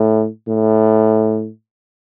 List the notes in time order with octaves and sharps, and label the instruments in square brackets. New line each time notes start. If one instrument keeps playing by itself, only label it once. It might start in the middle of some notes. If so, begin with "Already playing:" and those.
Already playing: [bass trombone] A2
A2